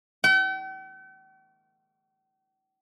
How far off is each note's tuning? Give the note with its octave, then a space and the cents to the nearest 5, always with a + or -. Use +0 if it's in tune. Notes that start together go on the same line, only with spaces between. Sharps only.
G5 -45